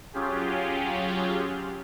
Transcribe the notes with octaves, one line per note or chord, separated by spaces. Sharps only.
F#3 C#4 F4 G4 G#4